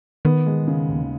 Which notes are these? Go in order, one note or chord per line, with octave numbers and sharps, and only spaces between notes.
D#3 B3
G#3
C#3
D#2